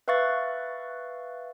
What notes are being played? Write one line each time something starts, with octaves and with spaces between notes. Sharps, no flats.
B4 E5 F5 C#6 F#6 A6